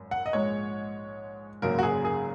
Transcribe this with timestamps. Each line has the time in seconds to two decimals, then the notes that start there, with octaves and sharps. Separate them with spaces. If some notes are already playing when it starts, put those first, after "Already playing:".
Already playing: G#1 F#2
0.11 F#5
0.26 D#5
0.33 A#1 G#2 G#3 C#5
1.62 G#1 F#2 C#3 F#3 A#3 A#4
1.79 F#4
1.83 G#4
2.05 G#4